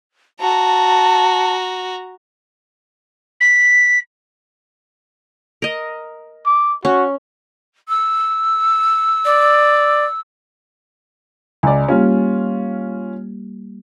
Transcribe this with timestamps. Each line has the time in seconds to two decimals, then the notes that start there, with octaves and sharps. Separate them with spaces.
0.40 F#4 A5 A#5
3.40 B6
5.62 A#4 D#5
6.46 D6
6.85 C#4 F#4
7.89 E6
9.25 D5
11.63 C#2 D5 G#5
11.89 G3 A#3 C#4 F4 G4